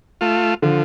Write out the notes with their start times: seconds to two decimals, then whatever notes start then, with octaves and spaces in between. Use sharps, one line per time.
0.21 A3 F4
0.62 D3 F3